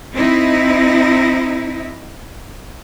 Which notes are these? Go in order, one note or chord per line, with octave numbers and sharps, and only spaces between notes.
C4 D#4 E4